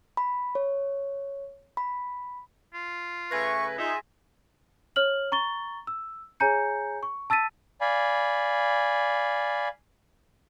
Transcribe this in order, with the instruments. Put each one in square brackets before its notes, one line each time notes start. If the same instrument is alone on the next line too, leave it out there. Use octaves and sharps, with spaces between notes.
[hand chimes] B5
C#5
B5
[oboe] F4
[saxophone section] C#3 A3 B4 [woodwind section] E5 C#6 [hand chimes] G#5 G#6 A#6
[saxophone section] D#4 [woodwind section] F4 G#4 [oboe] E5
[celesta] C#5 F6 F#7
A#5 C#6 A6 G7
E6
G#4 C#5 G#5 A#5 G6 C#7
C#6
A5 E6 A6 B6 D#7
[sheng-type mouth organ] D5 F5 G#5 B5